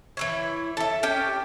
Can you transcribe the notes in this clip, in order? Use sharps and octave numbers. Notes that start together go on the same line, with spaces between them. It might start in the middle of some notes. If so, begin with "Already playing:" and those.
E3 E4 C#5
A4 E5
C#4 G4 G5